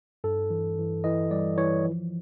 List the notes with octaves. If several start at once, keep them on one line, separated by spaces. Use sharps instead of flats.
G2 A4
E3
E3
E3 D#5
G3 D5
E3 C#5
F3